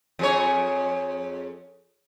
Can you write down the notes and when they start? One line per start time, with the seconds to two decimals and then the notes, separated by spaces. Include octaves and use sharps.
0.19 F2 G#4 C#5